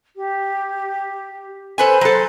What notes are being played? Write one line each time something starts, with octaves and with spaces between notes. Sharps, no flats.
G4
A4 B4 C5 G#5
F#3 A4